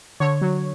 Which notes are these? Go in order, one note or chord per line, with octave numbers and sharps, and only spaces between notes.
D3 C#5
F#3